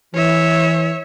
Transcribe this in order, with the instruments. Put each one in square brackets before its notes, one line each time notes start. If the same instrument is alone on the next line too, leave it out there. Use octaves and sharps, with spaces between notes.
[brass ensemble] E3 [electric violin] C#5 E5